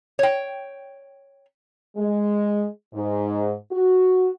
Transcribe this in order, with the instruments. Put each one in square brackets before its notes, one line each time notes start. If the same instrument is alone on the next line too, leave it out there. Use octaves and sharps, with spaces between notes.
[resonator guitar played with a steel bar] C#5 G5
[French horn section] G#3
G#2
F#4